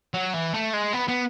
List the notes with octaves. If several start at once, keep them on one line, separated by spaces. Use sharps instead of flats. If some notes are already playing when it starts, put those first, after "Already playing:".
F#3
E3
A3
G#3
B3
B3